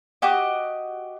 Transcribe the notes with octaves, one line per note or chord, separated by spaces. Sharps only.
F#4 G4 D#5